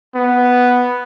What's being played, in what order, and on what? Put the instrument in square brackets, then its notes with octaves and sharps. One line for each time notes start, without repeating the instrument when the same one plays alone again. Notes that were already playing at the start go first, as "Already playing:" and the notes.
[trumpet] B3